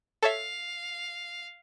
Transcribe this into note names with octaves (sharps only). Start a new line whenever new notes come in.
A4 C#5 E5 F5